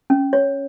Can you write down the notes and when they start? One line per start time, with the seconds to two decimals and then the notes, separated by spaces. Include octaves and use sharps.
0.10 C#4
0.33 C#5